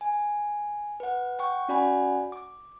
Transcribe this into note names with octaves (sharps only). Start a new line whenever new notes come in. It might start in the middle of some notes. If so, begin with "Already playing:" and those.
G#5
B4 F#5
F#5 G5 C#6
C#4 F#4 D5 F#5 G#5 B5
D6